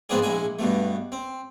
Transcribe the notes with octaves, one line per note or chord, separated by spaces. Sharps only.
G#2 F3 B3 C4 D4 G#4
A#1 G#3 E4 G#5
G2 B2 A3
C4